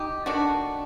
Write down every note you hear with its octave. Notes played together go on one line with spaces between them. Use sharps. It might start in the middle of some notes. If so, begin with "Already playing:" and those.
Already playing: D#4 G4
D#3 A3 D4 F#4